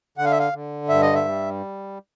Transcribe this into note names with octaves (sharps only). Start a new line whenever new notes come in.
D3 F#5
F5
E5
F5
D3
G2 E5
D#5
E5
G3